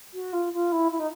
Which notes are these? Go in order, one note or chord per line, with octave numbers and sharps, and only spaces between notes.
F#4
F4
F4
E4
E4
D#4